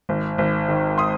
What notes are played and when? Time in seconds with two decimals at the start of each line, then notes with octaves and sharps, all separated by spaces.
0.09 G#1
0.38 G#1
0.69 D#3
0.98 C6 D#6